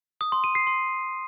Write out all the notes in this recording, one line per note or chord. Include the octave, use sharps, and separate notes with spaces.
D#6
C6
D#7
C7
C6